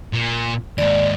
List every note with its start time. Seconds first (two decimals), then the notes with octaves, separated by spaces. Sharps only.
0.13 A#2
0.78 D#2 G#2 D5